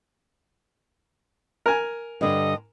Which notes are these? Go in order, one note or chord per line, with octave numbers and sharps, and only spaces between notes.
A#4 G#5
G2 D3 D#5